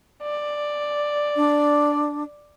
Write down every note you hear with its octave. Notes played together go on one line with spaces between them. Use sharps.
D5
D4